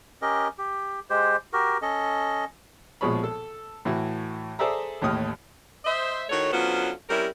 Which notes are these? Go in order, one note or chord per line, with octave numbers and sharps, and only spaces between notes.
C#4 G4 A#4 D#5
G4
G#3 G4 C5
F#4 G4 A#4
C#4 A4 D#5
A#1 B2 F3 G#3 C#5 B5
A4
A2 E3 F#4
G#4 A4 C5 D5 E5 A#5
A1 D#2 A2 D#6 F6
C5 D#5 E5
A2 D#3 A3 F#4 C#5
D3 F#3 B3 C#4 F4 C5
C3 G3 C#4 E4 A#4